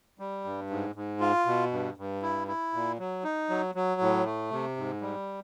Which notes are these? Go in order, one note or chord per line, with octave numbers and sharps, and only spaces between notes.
G3
G2
G#2
G#2
F4
B2
G2
G2
E4
E4
A#2
F#3
D#4
F#3
F#3
A2
A3
C3
G#2
G3